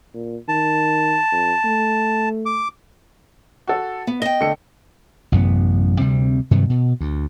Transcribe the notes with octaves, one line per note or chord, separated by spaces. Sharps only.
A#2
D#3 A5
F2
A3
D6
F#4 A4
B3
D#5 G5 G7
D3 A3 C#7
A1 F#2 C3 B3
D2 C3 G3 C4
G2 C3 D#3 F#3
B2
D2